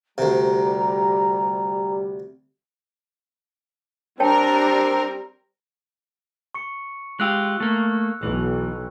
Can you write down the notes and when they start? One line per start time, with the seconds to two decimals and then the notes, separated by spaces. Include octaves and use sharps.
0.18 D2 C3 G3 A#5
4.20 G3 C4 D4 A#4 C#5 G5 A5
6.55 C#6 C#7
7.20 G#3 F4 G4 E6 F#6
7.60 A3 A#3
8.23 B1 E3